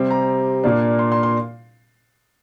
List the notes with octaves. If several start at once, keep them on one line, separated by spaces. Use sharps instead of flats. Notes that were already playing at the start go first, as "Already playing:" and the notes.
Already playing: C3 G3 C4
A#5
A#2 A#3 D4
C6
C6
C6